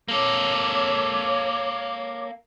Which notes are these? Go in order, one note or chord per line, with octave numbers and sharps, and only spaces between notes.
A#3 A4 C#5 D6